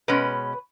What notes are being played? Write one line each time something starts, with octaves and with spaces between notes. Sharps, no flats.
B2 G#3 C#4 B4